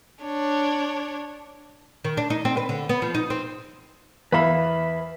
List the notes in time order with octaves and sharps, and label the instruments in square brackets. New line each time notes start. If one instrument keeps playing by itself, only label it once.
[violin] D4 C#5
[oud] D#3
D4
D#4
C4
B4
D3
B3
F3
D#4
C4
[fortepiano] E2 F5 B5 [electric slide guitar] B4 E5